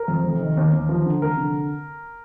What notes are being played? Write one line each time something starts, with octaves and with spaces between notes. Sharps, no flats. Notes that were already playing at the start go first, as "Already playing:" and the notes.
Already playing: A#4
F2
F1
D#3
D#2
D#2
F3
D3
F1 A#4
D3